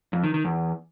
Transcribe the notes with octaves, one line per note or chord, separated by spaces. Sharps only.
F2
D#3
D#3
E2